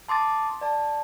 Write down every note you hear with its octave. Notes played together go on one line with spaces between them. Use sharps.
A5 C6 D6 D#6 A6
D5 A5